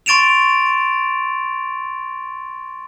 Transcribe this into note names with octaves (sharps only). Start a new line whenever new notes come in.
C6 C#6 A6 D7 E7 F7